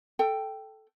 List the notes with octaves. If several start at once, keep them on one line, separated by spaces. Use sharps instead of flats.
A4 G5